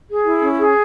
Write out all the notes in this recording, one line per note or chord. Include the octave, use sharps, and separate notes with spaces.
G#4
E4
C#4
G#4